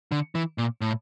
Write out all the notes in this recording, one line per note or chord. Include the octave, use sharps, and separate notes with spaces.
D3
E3
A#2
A2